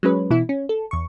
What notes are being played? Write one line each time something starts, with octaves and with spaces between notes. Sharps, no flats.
F#3 G#3 C#4 B4
B2 E3 E4
C#4
A4
E2 C#6